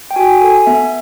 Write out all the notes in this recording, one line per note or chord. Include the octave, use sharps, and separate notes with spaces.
G5
F#4 G#5
A4 G#5
B3 E5